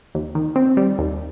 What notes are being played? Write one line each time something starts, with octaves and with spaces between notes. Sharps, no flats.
D#2
D#3
C4
G3
D#2